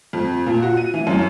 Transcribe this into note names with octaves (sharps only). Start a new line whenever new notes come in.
F2
A#2
F#4
D#7
E3
F#2